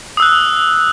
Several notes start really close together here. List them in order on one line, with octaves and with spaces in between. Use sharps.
D#6 E6 F#6